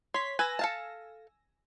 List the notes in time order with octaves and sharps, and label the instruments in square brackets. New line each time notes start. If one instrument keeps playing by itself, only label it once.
[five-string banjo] C#5 [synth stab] C6 B6
[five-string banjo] B4 [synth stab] G#5 E6 A#6
[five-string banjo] A4 F5 A5